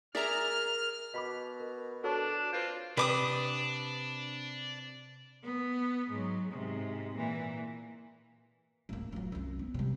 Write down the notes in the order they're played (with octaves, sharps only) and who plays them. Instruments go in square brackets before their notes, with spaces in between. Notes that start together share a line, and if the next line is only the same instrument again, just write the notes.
[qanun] G#4 A#4 [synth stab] D5 E5 A#5 [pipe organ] F6
[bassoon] B2 [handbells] D#5 B5 D6 [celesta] B6
[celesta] A#4
[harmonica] D4 [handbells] F#4 A4 B4 [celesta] C#5 A5
[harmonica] C4 F4 [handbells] B4 G6
[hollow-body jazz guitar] C3 D5 [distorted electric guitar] D4 [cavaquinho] B4 D6 D#6
[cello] B3
G#2 F#3
G#2 C3
A#2 E3
[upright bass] D1 A#3
F1 F#3
C2 F#2
B3
C3 G3